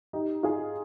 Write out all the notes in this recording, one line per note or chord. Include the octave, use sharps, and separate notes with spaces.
D#4 G4
F4 G#4